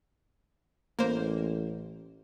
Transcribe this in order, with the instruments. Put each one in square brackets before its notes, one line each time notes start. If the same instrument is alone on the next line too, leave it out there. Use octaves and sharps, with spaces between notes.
[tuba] A1 [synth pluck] A#3 C5